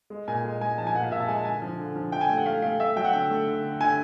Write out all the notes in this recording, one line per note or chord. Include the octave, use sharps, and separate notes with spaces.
G#3
A#2 G#5
G#3
G#3 G#5
F3 A5
G#5
A#2 F#5
F5
A#2 E5
A5
G#3 G#5
A5
D3 G#5
F3
D3
F3
D3 G5
G#5
A3 G5
F#5
A3 F5
A3 F5
A3 E5
F#3 G5
F#5
D3 G5
A3
D3
D3
D3 G#5